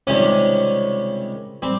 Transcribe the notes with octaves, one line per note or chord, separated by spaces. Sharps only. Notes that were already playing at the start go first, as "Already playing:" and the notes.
C#2 C3 D#3 G3 C#4
G3 C4